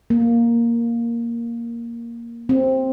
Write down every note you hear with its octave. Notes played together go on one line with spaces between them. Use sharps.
A#3
C4